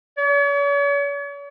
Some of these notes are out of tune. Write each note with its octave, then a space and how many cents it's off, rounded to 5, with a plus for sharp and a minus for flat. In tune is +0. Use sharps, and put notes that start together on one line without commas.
C#5 +45